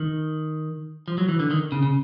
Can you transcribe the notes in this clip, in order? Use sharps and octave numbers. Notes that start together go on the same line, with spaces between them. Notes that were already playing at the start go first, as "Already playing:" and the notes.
Already playing: D#3
F3
F#3
E3
D3
D#3
C#3
C#3